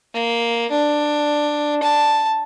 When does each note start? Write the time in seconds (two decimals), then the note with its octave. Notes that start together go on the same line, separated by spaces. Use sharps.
0.14 A#3
0.71 D4
1.83 A5